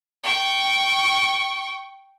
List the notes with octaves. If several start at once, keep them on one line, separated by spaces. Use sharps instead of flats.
G5 C#6